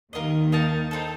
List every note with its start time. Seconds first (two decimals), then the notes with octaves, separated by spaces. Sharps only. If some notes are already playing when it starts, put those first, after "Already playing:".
0.13 D#2 D#3 F4 A#4 D#5
0.52 D#4 A#4 F5 A5
0.91 C4 D#4 A4